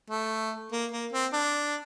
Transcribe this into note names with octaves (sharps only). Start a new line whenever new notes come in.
A3
A#3
A#3
C4
D4